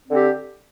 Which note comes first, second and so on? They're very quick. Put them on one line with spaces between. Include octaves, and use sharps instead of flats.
C4 D3 G4